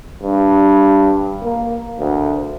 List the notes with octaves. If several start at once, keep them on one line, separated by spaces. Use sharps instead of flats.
G2
A#3
D2